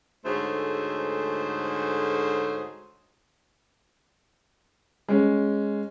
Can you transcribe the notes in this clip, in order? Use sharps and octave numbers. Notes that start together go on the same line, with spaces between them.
D2 G#2 A3 G#4 C5 C#5
G#3 C#4